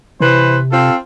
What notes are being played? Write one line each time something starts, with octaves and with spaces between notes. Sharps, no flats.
C3 E3 B4 C5
C4 F4 A4